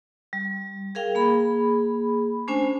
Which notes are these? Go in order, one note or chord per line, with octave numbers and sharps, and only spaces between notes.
G3
G#4 A#4 F5 G5
A#3 G#4 B5
A3 C#4 D4 C5 G#5